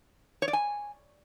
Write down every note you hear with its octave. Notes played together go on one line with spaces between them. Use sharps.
C#5
D5
G#5